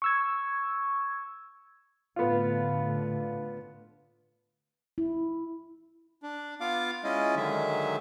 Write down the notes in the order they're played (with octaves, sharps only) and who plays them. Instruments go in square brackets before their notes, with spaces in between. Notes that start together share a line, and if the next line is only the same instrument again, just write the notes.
[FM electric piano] C#6 E6 G#6
[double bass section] A2 D3 [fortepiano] B3 F4
[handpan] E4
[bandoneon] D4
B3 F4 F5 D6
G#3 C#4 E4 F4 D#5
D3 D#3 F#3 G#3 E5